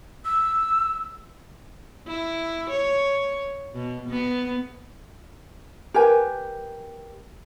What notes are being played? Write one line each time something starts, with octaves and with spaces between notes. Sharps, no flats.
E6
E4
C#5
B2
B3
G4 A#4 B4 G#5